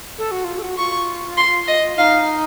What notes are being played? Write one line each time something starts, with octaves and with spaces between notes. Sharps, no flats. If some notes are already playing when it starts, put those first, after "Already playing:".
A4
F#4
F4
A4
F#4
F4 C#6
C6
D#5
D#4 F5